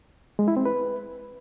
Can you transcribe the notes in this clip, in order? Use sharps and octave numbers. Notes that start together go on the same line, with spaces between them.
G#3
E4
C4
B4